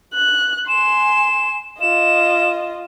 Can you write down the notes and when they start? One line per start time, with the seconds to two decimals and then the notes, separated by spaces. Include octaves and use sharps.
0.14 F#6
0.68 G#5 C6 E7
1.81 F4 D#5 E7